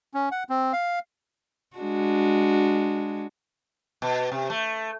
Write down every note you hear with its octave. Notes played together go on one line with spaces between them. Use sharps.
C#4
F#5
C4
F5
G#3 D4 F#4
B2
C3
A3